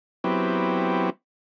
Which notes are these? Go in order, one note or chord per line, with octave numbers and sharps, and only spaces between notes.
F#3 B3 C4 E4 G4